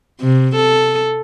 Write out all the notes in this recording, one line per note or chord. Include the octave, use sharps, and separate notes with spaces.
C3
A4